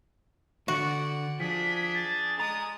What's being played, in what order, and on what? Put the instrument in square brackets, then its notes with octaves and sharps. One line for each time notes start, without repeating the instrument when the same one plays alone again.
[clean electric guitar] D3 [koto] F#4 [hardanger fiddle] D5 F#5
[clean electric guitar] F3 [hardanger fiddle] D4 G#4 [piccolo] B6
[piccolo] A6
[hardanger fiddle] G#3 D#6 [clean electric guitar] A#5